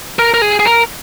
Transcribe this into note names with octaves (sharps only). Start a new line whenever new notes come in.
A#4
A#4
G#4
G#4
A#4